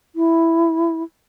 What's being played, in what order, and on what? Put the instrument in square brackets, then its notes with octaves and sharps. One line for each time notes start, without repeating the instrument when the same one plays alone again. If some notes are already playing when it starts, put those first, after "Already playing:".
[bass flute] E4